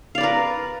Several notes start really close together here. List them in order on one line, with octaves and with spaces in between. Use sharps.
F5 D5 B4 A#4